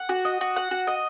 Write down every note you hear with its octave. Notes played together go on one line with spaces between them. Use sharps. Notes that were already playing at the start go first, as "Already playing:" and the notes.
Already playing: F#5
F#4
D#5
F#4
F#5
F#4
D#5